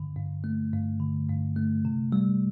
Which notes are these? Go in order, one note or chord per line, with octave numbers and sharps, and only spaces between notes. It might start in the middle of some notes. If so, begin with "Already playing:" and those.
Already playing: G2 D3
G2
A3
G2
D3
G2
A3
C3
G3